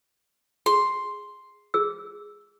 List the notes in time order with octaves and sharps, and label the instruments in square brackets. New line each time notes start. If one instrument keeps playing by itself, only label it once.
[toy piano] G#4 [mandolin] C6
[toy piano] G#4 E6